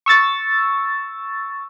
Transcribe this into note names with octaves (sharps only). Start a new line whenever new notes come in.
C#6 E6 A6